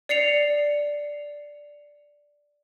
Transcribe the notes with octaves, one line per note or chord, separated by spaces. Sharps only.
D5 C7 C#7 F7